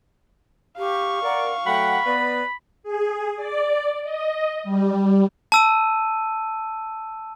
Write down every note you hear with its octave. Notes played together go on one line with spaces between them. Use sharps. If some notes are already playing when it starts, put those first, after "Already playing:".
G4 F5 C#6
A#4 D5 F#5
F#3 A3 F#5 G5 B5
B3 B4 D5
G#4
D5
D#5
G3
A5 E6 D#7